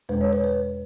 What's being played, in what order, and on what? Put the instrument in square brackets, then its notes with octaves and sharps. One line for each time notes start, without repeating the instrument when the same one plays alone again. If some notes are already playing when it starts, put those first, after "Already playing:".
[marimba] E2 B2 G#3 B4
C#5
B4
B4